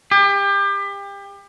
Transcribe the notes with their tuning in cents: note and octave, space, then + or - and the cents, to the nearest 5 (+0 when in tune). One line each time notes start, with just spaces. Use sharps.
G4 +30